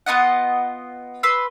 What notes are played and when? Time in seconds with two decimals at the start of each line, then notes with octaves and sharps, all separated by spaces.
0.06 B3 F4 D#5 F#5
1.23 B4 C6 E6